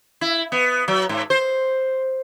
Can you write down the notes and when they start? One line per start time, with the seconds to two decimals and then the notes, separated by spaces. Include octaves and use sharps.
0.21 E4
0.52 B3
0.88 F#3
1.09 G#2
1.30 C5